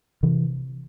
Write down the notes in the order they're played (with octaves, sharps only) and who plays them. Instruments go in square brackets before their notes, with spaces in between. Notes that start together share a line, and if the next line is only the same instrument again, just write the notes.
[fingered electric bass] C3 E3